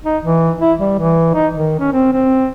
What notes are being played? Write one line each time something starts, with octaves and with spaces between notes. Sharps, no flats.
D#4
E3
E4
G3
E3
D#4
D#3
C#4
C4
C4